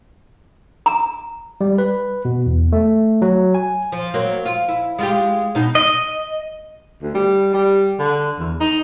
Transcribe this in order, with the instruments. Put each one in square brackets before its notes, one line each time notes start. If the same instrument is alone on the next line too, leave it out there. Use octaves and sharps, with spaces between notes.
[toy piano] A#5
[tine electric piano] G3
B4
B2
E2
A3
F#3
G#5
[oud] F3
F#3 A#3 C4
F4
E4
G#3 F4 G4
B2 D#4
[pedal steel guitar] D#5
[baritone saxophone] D2
G3
G3
D3
E2
D#4